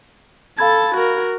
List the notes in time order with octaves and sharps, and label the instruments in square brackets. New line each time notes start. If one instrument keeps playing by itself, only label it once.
[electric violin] A4 A5 [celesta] F5 B5 G#6
[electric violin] F#4 A#4